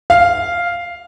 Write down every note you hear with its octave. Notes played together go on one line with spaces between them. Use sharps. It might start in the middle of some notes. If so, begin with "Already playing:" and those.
F5